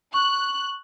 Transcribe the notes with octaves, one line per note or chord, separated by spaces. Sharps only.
C#6 F#6